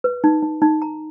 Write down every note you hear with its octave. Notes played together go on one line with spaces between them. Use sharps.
B4
D#4
D#4
D#4
A#5